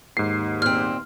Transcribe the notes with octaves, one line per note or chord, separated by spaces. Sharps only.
D#2 G#2 C7
A#2 C4 F6